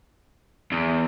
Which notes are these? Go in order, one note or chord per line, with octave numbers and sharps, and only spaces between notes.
E2